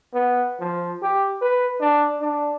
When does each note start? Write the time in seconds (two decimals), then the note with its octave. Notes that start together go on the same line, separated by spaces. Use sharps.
0.14 B3
0.60 F3
1.02 G4
1.42 B4
1.80 D4
2.21 D4